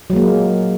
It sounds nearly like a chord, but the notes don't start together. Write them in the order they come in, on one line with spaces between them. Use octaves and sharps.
F#3 G#3 A#3